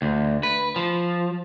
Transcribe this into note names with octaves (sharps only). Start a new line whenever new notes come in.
D2
B4
F3